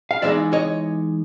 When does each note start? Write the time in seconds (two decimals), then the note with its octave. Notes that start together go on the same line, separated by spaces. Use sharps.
0.11 F5
0.22 E3 G#3 B3 D#4 D5 E5
0.53 C#5 D#5